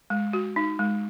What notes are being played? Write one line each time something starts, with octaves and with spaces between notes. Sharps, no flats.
G#3
F#4
D#4
G#3